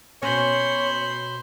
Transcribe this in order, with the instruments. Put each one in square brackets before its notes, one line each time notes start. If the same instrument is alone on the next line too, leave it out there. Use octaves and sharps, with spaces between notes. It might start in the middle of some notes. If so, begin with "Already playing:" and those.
[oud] B2 C#4 [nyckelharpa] C5 B5 [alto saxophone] C#5